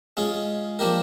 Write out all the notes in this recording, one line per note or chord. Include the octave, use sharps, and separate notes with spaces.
G#3 C#4 F4 G#4
F3 A#3 D4 G4 A#4